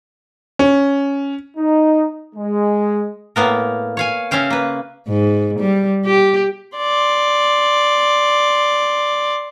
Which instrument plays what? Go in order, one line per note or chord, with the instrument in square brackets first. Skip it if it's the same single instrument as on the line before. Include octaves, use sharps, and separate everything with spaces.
[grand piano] C#4
[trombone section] D#4
G#3
[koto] A2 A#3 B3 A#4
C#5 F5 G#5
C#3 C#4 E5 F5 G5
A#3 B4
[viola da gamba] G#2
G3
G4
[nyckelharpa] D5 C6